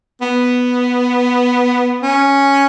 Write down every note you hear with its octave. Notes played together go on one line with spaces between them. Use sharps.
B3
C#4